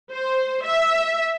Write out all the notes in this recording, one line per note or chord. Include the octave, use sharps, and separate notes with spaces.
C5
E5